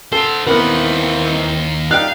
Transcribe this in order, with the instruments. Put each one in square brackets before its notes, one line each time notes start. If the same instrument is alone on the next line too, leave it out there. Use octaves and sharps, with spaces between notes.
[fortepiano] A4 [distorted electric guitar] C5 F#5
[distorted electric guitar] D#2 F#5 [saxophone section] D#3 E3 C4 [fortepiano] B3 A#4 B4
[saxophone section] G3 D4 D#4 [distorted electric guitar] F5 [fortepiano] G5 F#6